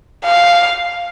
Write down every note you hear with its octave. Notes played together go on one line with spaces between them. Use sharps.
F5